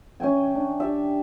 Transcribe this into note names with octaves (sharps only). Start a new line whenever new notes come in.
C#4 E5 G5 G#5
D4
G4 D5 E5